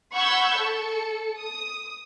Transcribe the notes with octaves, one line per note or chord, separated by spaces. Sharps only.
F#5 B5 C#6 E6 G6 G#6
A4 C#7
D#6